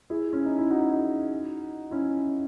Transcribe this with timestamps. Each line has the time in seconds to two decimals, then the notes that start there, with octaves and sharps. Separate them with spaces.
0.10 E4 G#4
0.33 C#4
0.45 D#4
0.58 E4
0.70 D#4 F#4
1.91 C#4 E4